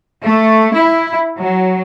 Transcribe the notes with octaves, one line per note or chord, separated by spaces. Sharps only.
A3
E4
F#3